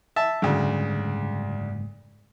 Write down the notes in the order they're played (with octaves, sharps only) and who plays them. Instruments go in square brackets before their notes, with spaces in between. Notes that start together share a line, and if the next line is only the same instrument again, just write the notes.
[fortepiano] E5 A5
[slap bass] F#1 G#2 G3 [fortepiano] D2 C#3